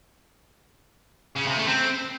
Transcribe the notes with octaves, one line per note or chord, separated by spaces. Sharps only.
C#3
C3
A3
C4